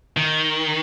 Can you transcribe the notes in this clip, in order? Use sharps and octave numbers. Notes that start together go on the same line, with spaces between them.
D#3